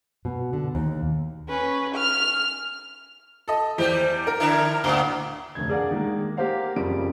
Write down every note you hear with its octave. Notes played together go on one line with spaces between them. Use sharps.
B2
D3
D#2
C#4 B4
F6
A4 D#5
E2 G3 G4 C5
A#4
D3 D4 E4 A#5
D2 A2 B3
F1 D2 G#6
D4 G#4 A#4 D5 F5 F#5
D#3 G#3 A#3
A#3 G4 A#4 C5 F5 F#5
F#1 F2 C#3 G3 D7